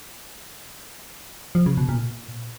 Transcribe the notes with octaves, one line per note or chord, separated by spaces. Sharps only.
F3
C#3
B2
A#2